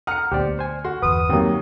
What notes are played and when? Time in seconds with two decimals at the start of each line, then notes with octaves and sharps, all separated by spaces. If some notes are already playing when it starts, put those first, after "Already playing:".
0.07 F#5 A#5 D#6 F6 C#7
0.32 D2 A#2 B3 G4 C5 D5
0.59 C5 G#5
0.85 F#4 C6
1.02 G1 E2 B4 D#6
1.30 D#2 F#3 A#3 C4